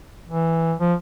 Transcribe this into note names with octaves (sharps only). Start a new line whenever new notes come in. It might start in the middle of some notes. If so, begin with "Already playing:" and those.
E3
F3